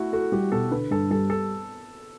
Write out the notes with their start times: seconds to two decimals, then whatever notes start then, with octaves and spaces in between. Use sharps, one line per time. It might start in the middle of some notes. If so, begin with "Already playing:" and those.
Already playing: A3 E4 F#4
0.12 F#4 A4
0.32 G3 G4
0.52 B2 A4
0.71 D3 B4
0.91 G2 A4
1.10 G3 A4
1.30 A4